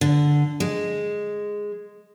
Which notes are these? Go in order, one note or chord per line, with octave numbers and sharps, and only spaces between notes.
D3
G#3